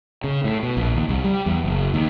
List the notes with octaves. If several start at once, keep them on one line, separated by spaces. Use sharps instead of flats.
C#3
A2
B2
A#1
D#2
C2
G3
E2
F#1
D#2